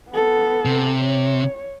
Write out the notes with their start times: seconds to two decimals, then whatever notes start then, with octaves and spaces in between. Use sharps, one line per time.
0.10 B3 A4
0.65 C3
1.02 C#5